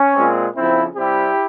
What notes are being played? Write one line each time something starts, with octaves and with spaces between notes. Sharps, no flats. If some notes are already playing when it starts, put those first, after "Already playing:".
Already playing: C#4
A#2 G#3 C4
F2 C#3 F3 C4 E4
C3 G3 C4 E4 G4